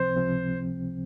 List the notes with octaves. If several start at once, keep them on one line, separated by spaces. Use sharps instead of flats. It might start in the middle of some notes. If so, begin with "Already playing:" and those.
Already playing: C#2 C3 F3 C4 C5
C#2 C3 F3 C4